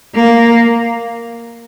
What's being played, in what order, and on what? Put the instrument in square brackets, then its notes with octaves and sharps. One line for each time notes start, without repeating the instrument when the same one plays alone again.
[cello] A#3